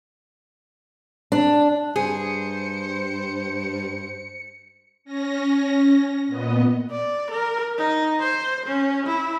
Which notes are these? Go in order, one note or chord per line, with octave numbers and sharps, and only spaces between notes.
D4
G2 G#4 C5 C#7
C#4 A#6
A#2 B3 D#5
D5
A#4
D#4
C5
C#4
E4